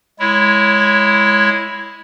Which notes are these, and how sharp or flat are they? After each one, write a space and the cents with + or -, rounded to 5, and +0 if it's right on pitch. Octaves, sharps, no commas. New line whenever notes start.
G#3 -5 E4 +0 C#5 +0